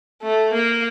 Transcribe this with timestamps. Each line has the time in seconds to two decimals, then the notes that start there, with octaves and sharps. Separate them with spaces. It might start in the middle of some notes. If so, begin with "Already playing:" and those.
0.23 A3
0.53 A#3